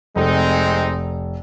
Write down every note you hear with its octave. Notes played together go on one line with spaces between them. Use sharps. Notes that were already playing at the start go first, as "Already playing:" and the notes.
F1 G#3 C4 D#4